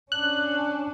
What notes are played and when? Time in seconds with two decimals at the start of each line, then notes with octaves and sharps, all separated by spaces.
0.12 C#4 D4 F#6